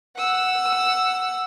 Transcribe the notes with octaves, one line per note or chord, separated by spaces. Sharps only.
F#5 E6